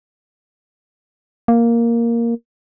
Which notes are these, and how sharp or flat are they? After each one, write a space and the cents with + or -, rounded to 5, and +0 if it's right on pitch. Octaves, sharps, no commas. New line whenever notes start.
A#3 +0